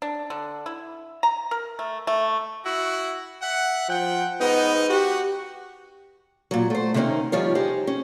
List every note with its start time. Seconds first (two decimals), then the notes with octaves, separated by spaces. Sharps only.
0.02 D4
0.30 D3
0.66 E4
1.23 A#5
1.51 A#4
1.79 A3
2.07 A3
2.65 E4 F#4
3.42 E5 F#5
3.89 F3 F#5 G5
4.41 G#2 B3 D#4
4.90 F#4 G4
6.51 A#2 F#3
6.70 A3 C5
6.94 C3 D#3 A#3 C#4 D#4
7.32 D#3 F3 G3 F4 C#5
7.55 D#4 G4 G#4 C5
7.87 C#4